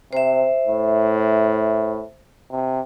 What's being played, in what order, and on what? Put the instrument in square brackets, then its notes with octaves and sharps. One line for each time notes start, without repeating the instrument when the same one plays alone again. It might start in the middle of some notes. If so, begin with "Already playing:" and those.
[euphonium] C3 [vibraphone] C5 E5
[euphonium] A2
C3